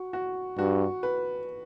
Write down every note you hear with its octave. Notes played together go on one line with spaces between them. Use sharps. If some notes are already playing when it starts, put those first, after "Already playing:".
Already playing: F#4
F#4
G2 F#4
B4